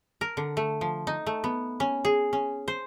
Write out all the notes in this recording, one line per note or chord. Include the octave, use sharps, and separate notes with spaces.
A#4
D3
A3
F3
D#4
A3
B3
C#4
G#4
C#4
C5